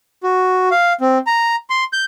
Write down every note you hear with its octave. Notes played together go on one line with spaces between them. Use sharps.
F#4
F5
C4
A#5
C6
G6